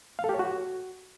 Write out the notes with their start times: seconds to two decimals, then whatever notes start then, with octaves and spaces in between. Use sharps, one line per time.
0.19 F5
0.24 A4
0.29 G4
0.34 C#5
0.39 F#4